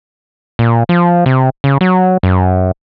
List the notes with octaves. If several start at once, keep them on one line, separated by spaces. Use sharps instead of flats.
A#2
F3
C3
C#3
F#3
F#2